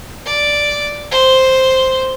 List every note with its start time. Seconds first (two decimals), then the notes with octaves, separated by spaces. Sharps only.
0.26 D5
1.11 C5